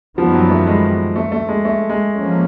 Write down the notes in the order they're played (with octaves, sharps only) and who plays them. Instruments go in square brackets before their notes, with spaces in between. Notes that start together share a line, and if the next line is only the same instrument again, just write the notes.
[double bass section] F#2 D#3 G3 B3 [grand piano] F3
[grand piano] F#3
A3
G#3
A3
A3
G#3
A3
G#3
[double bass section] F3 A#3 C#4